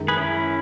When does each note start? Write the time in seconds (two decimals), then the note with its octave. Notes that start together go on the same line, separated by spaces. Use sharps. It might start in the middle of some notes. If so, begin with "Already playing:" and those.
Already playing: F#2 D#3 G#3
0.08 G#4 B4
0.17 C#4 E4